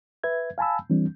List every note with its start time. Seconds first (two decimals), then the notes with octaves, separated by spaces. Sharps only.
0.24 B4 E5 G#6
0.58 F5 G#5 A5 B5 E6
0.90 E3 G3 C4 D4